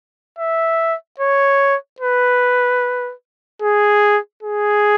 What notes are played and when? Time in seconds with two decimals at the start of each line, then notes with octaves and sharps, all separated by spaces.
0.39 E5
1.20 C#5
2.00 B4
3.62 G#4
4.43 G#4